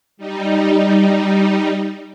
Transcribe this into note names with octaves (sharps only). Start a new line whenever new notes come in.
G3 D#4